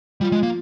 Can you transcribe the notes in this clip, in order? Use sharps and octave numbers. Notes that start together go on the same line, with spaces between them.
F3 G3
G#3
A#3